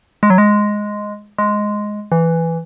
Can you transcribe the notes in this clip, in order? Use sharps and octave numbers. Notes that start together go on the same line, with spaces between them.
G#3
F#3
G#3
G#3
E3